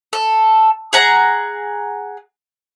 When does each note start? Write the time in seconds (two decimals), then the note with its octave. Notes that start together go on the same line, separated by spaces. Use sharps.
0.13 A4
0.93 G#4 F#5 A#5